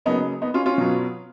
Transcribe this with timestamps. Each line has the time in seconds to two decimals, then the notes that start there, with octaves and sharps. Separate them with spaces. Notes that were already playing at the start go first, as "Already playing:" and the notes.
0.06 C#3 F#3 A#3 B3 D#4
0.42 B3 D#4
0.54 C#4 F4
0.66 C#4 F4
0.78 B2 F#3 B3